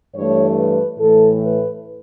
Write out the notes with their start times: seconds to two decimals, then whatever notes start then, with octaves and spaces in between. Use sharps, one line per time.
0.15 G2 E3 A3 C#5
0.56 B4
0.98 A2 E3 A3 A4
1.39 B4